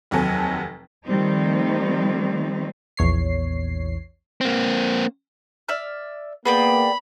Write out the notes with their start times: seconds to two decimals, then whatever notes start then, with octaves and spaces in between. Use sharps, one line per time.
0.11 F1 D#2 C3 F#3 A4 G#5
1.08 D#3 F3 G3 A3 C4 D#4
2.97 A#1 E2 C#5 C7
4.41 A#3 C4
5.69 D5 E5 F6
6.45 A#3 B3 G#4 D5 G5 B5